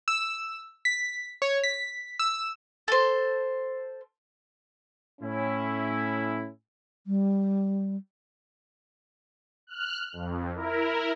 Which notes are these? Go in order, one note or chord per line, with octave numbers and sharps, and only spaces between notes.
E6
B6
C#5
B6
E6
A4 C5
A2 C#4 E4
G3
F6 F#6
F2
E4 A#4